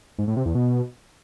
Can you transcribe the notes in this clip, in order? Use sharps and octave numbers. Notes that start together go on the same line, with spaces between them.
G#2
A2
C3
E2
B2